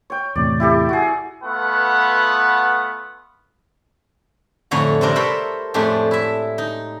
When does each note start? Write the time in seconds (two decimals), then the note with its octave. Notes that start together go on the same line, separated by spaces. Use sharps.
0.10 C#5 G5
0.35 E2 A2 C3 D5
0.60 E4 G4 A4
0.89 F#4 G#4
1.42 A3 B3 F4 B4 F#5
4.71 F2 A2 D3 C#5 G#5 A#5
5.01 C3 G3 C4 D4 A#4
5.15 A4 A#4 C5 C#5 E5 B5
5.74 F2 A2 G#3 A3 D4 G4
6.11 E4 E5
6.58 D#4